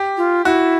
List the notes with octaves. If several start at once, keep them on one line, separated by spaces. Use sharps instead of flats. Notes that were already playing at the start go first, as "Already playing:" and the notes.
Already playing: G4
F4
E4 F#4